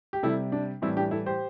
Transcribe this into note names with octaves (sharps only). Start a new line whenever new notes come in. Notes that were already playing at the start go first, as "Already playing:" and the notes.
G4
C3 G3 E4 A4
D4
A2 E3 G3 C4 E4
D4 G4
E4 A4
G4 C5